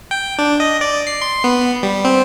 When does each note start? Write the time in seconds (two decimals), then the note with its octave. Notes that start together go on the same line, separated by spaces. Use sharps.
0.11 G5
0.39 D4
0.60 D#5
0.81 D5
1.07 C7
1.22 C6
1.44 B3
1.83 G3
2.05 C4